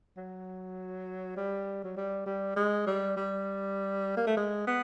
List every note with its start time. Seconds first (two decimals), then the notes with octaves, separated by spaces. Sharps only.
0.17 F#3
1.37 G3
1.84 F#3
1.97 G3
2.26 G3
2.56 G#3
2.87 G3
3.17 G3
4.17 A#3
4.27 A3
4.37 G#3
4.67 B3